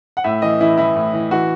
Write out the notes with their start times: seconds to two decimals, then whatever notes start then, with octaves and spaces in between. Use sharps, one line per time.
0.17 F#5
0.24 A2 E5
0.42 E3 D#5
0.60 E3 E4
0.78 E3 E4
0.96 A2
1.13 E3
1.31 E3 F#4